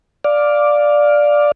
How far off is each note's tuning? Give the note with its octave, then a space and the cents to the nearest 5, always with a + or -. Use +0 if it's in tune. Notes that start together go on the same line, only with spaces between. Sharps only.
D5 +0 F5 +10